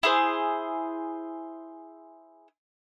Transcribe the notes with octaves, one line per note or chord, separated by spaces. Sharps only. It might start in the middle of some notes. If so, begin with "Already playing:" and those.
E4 G#4 C5